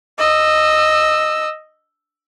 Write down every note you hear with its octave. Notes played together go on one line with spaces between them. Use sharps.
D#5 E6